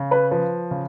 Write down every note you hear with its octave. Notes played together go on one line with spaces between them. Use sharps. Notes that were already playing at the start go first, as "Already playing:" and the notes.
Already playing: C#3
B4
F3 B4
C#3